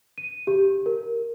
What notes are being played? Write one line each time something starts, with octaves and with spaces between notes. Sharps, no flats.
D#7
G4
A#4